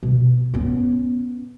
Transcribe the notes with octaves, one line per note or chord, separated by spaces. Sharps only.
B2
B3 C#4